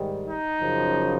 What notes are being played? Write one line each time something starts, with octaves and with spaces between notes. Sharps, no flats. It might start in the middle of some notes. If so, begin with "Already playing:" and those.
Already playing: G#2 D#3 G3
D#4
F#2 C#3 F3